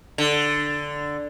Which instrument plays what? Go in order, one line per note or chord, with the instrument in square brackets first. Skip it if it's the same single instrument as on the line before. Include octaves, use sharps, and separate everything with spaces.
[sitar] D3